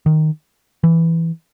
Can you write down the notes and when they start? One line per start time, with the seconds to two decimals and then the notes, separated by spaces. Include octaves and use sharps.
0.06 D#3
0.84 E3